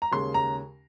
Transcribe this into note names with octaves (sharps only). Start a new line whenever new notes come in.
A#5
D#2 C#3 G#3 C6
A#5